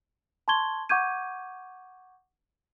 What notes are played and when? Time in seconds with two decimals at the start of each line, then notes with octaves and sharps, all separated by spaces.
0.48 A5 C6 C#6 G#6 G7
0.89 F#5 C#6 D6 G6 G#6 D#7